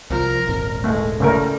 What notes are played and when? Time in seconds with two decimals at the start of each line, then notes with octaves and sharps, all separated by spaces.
0.10 C2 F3 A#4
0.47 D#1 G#1
0.84 G#3 A3
1.20 C#3 G3 A3 A#4